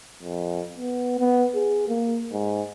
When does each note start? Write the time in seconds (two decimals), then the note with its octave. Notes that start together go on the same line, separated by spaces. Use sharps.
0.22 F2
0.78 B3
1.19 B3
1.55 G#4
1.88 A#3
2.32 G#2